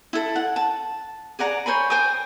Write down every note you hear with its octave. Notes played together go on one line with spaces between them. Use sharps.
E4 A4
F#5
A5
G#4 D5 F#5 A#5
C5 C#5 G#5 B5
C5 G5 G#5 D#6